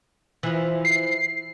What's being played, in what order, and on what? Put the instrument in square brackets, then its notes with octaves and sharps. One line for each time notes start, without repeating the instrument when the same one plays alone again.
[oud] E3 F3
[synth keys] C7